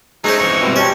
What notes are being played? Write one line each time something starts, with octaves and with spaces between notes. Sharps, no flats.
G#3 A3 C#4 D#4 G#4 C5
F2 E3 C#6
B2 G3 C4
G#3 C#4 G4 D5 G5 A5